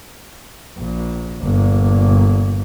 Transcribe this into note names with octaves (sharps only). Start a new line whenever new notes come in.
A#1
G1 A#2